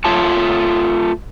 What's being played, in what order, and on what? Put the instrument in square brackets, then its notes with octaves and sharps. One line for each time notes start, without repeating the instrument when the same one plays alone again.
[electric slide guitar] A3 F4 C#5 A5